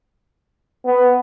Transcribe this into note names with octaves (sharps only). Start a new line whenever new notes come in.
B3